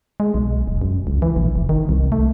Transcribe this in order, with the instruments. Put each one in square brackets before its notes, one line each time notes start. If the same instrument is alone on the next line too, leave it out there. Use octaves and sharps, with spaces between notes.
[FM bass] G#3
B1
E1
F#2
C#2
E3
A#1
F1
D#3
C2
A3